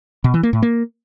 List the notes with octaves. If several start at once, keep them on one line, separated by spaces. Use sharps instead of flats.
B2
E3
A#3
A2
A#3